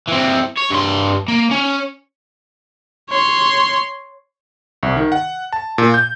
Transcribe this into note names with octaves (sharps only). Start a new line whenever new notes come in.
E3 C4
C#5
G2 C6
A#3
C#4
C#5 C6
C2
D#3
F#5
A5
A#2
G6